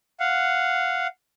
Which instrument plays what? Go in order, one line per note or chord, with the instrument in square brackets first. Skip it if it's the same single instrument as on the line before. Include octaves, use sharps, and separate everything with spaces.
[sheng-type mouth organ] F5 F#5